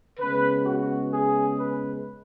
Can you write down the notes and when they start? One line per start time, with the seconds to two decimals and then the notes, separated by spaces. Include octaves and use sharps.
0.20 C#3 G#3 B3 B4
0.66 F#4
1.13 G#4
1.60 B4